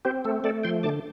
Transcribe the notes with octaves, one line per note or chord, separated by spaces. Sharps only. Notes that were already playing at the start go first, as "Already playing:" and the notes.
C4 G4 C5
A3 A4
A3 A4 D5
F3 G5 C6
D3 A5 D6